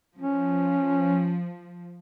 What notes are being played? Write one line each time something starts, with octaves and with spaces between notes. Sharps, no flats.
F3 C#4